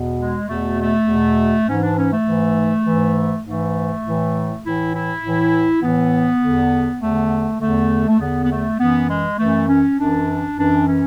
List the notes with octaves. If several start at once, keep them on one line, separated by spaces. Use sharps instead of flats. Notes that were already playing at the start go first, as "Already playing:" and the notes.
Already playing: E2 B2
G#3
E2 B2 A3
A3
E2 B2
G#2 E3 C#4
D4
C#4
A3
G#2 E3
G#2 E3
G#2 E3 A3
A2 E3
A2 E3 E4
E4
A2 E3
A2 E3 B3
E2 D3
E2 D3 A3
E2 D3 A3
A3
E2 D3 B3
B3
A3
F#2 E3 B3
G#3
F#2 E3 A3
C#4
F#2 E3 D4
F#2 E3 D4
C#4